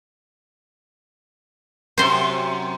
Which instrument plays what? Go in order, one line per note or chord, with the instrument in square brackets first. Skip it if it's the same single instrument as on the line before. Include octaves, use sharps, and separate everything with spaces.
[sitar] F#2 C3 F#4 [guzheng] C5 C6